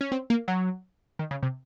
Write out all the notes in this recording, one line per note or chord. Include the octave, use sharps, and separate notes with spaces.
C#4
C4
A#3
F#3
D#3
C#3
C3